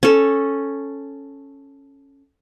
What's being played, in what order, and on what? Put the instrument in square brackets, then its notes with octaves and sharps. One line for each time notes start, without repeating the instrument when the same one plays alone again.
[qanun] C#4 A4